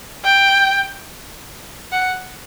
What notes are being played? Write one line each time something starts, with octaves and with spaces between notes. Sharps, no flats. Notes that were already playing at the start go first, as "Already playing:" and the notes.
G5
F#5